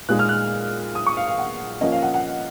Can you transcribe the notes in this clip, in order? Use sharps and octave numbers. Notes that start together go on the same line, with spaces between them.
A#2 G#3 D#4 F#6
F6
F#6
D#6
C#6
F5
F5
F#5
F3 A#3 C#4 D#5
F5
F#5
F#5